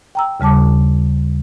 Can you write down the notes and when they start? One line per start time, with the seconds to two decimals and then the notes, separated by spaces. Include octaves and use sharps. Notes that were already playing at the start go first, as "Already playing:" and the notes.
0.15 G5 A#5 E6
0.40 D#2 C#3 G3 A5 D6